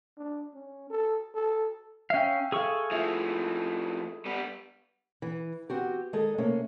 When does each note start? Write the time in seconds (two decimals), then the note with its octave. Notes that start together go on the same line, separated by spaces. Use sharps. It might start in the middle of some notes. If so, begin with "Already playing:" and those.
0.17 D4
0.54 C#4
0.90 A4
1.34 A4
2.10 C#4 E5 F5 G5
2.52 G#4 A4 F5 G#5 C#6
2.91 A2 F3 E5
4.26 G3 B3
5.22 E3
5.70 B3 C4 F#4 G4
6.13 D#3 G#3 G#4 A4 D#5
6.38 C3 A3 A#3 C#4